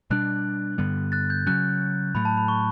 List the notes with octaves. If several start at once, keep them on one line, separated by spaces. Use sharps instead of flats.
B2 G3 D4 F#6
G2 D3 G3 B3
F#6 A6
G6
C#3 F#3 C#4 F#6
A2 F#3 A3 B5
A5
B5
C#6